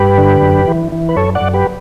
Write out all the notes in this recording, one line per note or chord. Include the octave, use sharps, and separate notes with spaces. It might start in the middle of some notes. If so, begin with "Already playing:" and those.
Already playing: G2 G4 B4
D3
F#2
E3
E3
B4
F#2 A4 C#5
D5 F#5
F#2
G4 B4